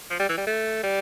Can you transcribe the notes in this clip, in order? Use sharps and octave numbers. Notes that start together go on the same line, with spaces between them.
F3
G3
E3
G3
A3
G3